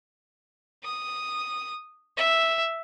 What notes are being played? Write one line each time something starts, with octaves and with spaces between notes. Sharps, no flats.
D#6
E5